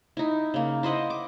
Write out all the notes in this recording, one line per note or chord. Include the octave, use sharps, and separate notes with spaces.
D#4 E4
C#3 A#3
E4 C5 D#5 F#5
D6